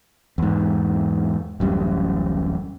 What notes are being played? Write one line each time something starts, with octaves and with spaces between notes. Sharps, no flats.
E2 G#2
D1 A1 F#2 G3